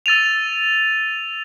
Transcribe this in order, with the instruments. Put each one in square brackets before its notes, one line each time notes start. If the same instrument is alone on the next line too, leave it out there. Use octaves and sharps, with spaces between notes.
[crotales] E6 A6 D#7 F7